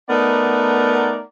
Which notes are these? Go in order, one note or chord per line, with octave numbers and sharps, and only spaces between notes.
A3 B3 D#4 A#4 D5 F#5